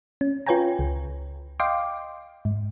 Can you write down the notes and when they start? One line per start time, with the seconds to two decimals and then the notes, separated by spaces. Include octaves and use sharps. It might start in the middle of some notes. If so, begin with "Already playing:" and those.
0.21 C#4
0.47 F4 B4 C#5 G5 G#5 A#5
0.79 C#2
1.60 D#5 F5 G5 C6 D6
2.45 G#2